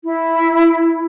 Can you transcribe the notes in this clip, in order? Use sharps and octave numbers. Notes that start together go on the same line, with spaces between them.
E4